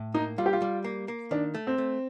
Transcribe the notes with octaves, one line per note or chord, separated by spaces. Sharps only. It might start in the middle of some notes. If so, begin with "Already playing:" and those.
Already playing: A2
A#3 D#4
G3 F4
G4
F4
G3
A#3
A#3
D#3 D4
A3
C4
A3